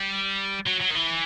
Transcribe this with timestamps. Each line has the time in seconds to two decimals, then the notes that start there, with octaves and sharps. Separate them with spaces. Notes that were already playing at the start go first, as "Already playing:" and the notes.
Already playing: G3
0.66 F#3
0.80 F#3
0.90 D#3
0.95 E3